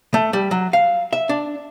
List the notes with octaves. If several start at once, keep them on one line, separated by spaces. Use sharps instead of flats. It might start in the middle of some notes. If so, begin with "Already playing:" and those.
A3
G3
F#3
F5
E5
D4